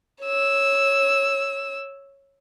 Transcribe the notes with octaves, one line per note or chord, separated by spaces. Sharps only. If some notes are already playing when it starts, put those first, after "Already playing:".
C#5 E6